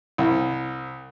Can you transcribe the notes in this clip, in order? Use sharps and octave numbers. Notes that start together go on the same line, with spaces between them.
C2